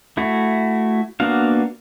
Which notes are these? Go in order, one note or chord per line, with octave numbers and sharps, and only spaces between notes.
A3 E4 F#4
A#3 B3 D4 F#4 F5